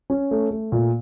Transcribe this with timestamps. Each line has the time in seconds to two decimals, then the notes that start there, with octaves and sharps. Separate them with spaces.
0.10 C#4
0.31 A3
0.51 A3
0.72 A#2